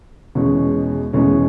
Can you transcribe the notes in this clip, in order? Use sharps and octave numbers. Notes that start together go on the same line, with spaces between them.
E2 B2 G#3 C#4
E2 B2 G#3 C#4